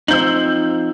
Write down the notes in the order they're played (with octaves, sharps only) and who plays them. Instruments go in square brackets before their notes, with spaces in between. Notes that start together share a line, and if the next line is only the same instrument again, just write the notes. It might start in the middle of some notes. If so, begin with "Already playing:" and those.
[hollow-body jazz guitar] F3 C4 D#4 [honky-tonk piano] E6 G6 F#7